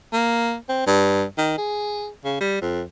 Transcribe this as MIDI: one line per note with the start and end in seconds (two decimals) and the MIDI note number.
0.13 0.56 58
0.69 0.85 60
0.87 1.24 43
1.38 1.56 51
1.58 2.08 68
2.25 2.37 49
2.41 2.59 55
2.61 2.83 41